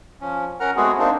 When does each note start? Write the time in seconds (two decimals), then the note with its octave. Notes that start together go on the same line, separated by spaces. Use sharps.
0.21 F3 C#4
0.60 C#4 A#4 F#5 A#5 F6
0.76 G#3 A3 B3 C4 F#4 G#4
0.99 A#3 C4 D4 D#4